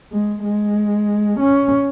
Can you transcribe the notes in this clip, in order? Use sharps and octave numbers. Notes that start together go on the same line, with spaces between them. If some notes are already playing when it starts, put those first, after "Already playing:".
G#3
G#3
C#4